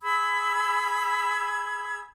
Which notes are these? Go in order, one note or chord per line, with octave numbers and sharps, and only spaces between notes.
G#4 B5 E6 G#6